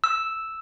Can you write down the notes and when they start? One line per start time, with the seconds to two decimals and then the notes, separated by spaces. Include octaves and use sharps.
0.04 E6